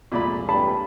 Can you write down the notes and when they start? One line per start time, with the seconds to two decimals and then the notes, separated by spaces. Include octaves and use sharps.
0.12 C2 F2 A#2 G#3 D5 B5
0.49 G2 A5 B5